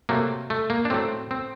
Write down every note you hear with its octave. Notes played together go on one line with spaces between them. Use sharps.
C3 F#3 A3 A#3
A3
A#3
D4
A2 F#3 A3 C4
C4